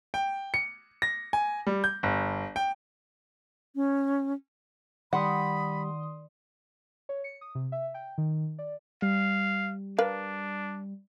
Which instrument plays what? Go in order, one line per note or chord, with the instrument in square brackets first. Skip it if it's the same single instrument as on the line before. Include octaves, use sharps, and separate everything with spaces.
[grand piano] G5
C#7
A#6
G#5
G3
G6
G1
G5
[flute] C#4
[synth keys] D#3 C6 D#6 [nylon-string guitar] G3 [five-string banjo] F#5 [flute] B5
[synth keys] C#5
C#7
D#6
C3
E5
G5
D#3
D5
[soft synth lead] G3 [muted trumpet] F5
[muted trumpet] D4 [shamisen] A#4 B4 F5